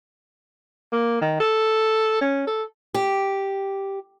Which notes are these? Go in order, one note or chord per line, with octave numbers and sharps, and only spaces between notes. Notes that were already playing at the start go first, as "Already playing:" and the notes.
A#3
D#3
A4
C#4
A4
G4